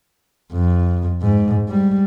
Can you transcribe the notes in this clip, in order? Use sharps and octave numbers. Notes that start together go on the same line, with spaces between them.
F2
G#2
G3